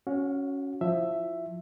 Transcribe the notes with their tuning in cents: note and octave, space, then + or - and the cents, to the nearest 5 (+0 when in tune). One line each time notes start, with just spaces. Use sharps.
C#4 +0 F#4 +0 F#5 -45
F3 +15 E4 +0 E5 +10